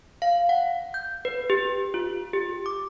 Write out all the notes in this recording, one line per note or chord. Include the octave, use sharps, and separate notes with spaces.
F5
F#5
G6
B4
G4
F4
G4
D6